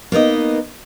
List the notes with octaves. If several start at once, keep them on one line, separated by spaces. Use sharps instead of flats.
A#3 B3 D#4 D#5